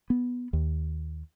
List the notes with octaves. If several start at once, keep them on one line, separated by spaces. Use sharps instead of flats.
B3
D#2